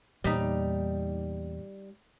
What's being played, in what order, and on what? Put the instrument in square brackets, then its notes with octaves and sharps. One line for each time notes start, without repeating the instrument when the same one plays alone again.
[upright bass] E2 A#2 [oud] G3 D#4